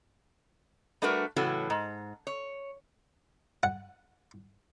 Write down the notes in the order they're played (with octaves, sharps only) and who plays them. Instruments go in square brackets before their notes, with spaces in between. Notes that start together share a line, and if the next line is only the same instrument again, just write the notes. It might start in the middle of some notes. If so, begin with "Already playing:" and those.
[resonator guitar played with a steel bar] G3 A3 D4 F#4 A#4 B4
A2 C#3 E3 F#3 F#4 A4
G#2
C#5
[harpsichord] F#5